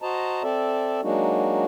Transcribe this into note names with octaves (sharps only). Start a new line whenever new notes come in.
F#4 C5 D#5 A5 A#5
C4 A4 D5 E5
F#3 G#3 A#3 D4 D#4 F#4